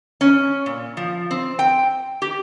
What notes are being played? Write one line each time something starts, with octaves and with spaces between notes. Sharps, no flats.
C#4
A#2
F3
C4
G5
G4